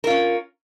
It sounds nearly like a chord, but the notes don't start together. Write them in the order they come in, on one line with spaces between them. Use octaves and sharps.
A#4 F4 C#4